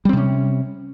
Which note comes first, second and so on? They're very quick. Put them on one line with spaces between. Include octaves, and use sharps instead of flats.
G3 C4 C3 C#4